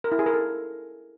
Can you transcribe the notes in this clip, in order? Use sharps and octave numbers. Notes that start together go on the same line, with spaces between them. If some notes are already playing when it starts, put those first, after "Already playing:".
A#4
E4
G#4
A#4
A4